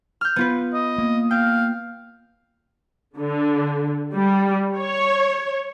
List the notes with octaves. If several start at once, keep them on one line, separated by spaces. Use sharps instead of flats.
F6 G6
B3 F4 B4
D#5
A#3
F5 G5
D3
G3
C#5